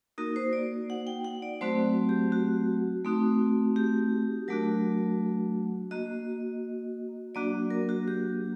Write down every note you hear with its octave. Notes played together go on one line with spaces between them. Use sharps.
A#3 D#4 F#4 A#4
C5
D5
F#5
G5
F#5
D5
F#3 A3 C4 F#4 C5
G4
F#4
A3 C4 D#4 F#4
G4
F#3 A3 D4 F#4 A#4
A#3 F#4 D#5
F#3 A#3 D4 F#4 D5
A#4
F#4
G4